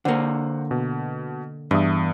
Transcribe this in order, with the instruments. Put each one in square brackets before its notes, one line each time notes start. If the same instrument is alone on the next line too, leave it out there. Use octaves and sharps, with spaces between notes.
[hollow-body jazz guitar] D3 A#3 [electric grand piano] C5 D5 F#5
[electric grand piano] B2
[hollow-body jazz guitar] E2 [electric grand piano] G2 E5 D#6